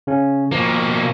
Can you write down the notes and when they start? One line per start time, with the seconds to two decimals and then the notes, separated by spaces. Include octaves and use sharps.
0.07 C#3 C#4
0.52 B2 F3 A#3